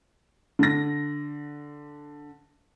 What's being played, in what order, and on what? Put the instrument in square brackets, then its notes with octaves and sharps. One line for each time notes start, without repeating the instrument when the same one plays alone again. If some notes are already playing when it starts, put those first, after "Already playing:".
[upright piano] D3 A#6